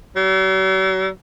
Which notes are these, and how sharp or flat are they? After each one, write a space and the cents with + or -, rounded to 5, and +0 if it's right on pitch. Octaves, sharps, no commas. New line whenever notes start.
F#3 +45